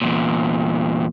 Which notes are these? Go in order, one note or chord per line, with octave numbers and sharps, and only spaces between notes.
E2 A#2